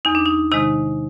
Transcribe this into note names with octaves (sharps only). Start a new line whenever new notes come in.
E2 D#4
D4
D#4
C3 D#3 G#3 D#4